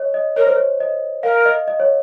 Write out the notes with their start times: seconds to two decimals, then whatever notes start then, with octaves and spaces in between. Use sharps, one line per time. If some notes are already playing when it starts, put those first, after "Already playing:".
Already playing: C#5 D#5
0.14 D#5
0.36 A#4 C#5
0.47 C5
0.56 C#5
0.80 D#5
1.23 A#4 F5
1.45 D#5
1.68 D#5
1.80 C#5